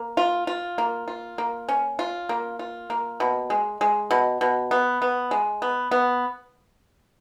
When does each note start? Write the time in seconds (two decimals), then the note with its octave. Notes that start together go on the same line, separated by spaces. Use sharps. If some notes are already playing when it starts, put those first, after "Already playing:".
Already playing: A#3
0.17 F4
0.47 F4
0.78 A#3
1.08 F4
1.38 A#3
1.69 C#4
1.99 F4
2.29 A#3
2.59 F4
2.90 A#3
3.20 B2
3.50 G#3
3.81 G#3
4.11 B2
4.41 B2
4.71 B3
5.02 B3
5.31 G#3
5.62 B3
5.91 B3